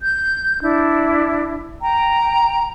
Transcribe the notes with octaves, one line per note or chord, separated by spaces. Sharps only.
G6
D4 E4
G5 A#5